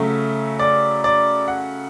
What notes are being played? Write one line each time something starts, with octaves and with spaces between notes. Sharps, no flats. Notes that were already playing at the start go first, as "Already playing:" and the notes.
Already playing: C#3 F#3 A3 E5
D5
D5
F#5